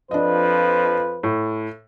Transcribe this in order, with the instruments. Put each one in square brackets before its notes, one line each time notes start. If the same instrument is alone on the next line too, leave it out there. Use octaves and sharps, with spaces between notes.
[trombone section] F2 F3 B4 [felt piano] D4 D#5
[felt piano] A2